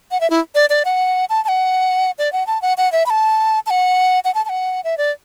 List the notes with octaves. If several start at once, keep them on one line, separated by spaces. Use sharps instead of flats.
F#5
E5
E4
D5
D5
F#5
A5
A5
F#5
D5
F#5
A5
F#5
F#5
E5
B5
A5
A5
F#5
F#5
A5
A5
F#5
E5
D5